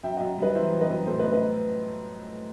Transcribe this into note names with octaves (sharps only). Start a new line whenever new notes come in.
F#2 E5 G5
F#2 D#5 F#5
G3 B4 D#5
E3 C5 E5
F#2
B4 D#5
F#2
A2 A4 C5
B4 D#5
A2
B4 D#5